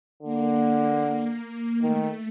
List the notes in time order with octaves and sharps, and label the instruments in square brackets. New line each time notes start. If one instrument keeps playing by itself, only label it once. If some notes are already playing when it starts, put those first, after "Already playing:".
[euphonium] D3 [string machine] A#3
[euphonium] D#3 [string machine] A3